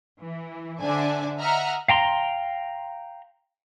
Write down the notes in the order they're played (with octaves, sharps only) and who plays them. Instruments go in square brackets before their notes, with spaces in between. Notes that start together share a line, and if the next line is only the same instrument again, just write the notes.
[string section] E3
D3 D4 C5 E5 G#5 A5
D#5 E5 F#5 A#5 F6
[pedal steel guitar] F5 G5 A#5 C6